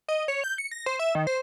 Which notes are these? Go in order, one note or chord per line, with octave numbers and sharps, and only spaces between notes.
D#5
C#5
G6
C#7
A#6
C5
E5
D#3
C5